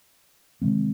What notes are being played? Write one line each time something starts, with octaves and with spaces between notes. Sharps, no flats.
C3 D#3 G#3 C4